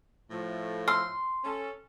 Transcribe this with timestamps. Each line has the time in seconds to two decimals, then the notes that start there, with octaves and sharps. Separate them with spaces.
0.31 A2 F3 A3
0.88 C6 E6 F6
1.44 C#4 A4